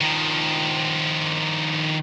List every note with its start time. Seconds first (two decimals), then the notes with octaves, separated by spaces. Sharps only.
0.01 D#3 F3